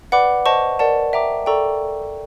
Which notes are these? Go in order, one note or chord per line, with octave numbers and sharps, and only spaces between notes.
B4 D5 F#5 B5 D6
C5 D#5 F#5 A5 C#6
A#4 D5 F#5 A5
E5 G5 A#5 D6
A4 D5 G5 A#5 C#6